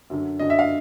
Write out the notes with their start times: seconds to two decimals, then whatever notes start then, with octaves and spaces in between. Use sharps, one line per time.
0.10 F#2 D3 F#3
0.39 F#2 D3 F#3 D#5
0.50 E5
0.59 F5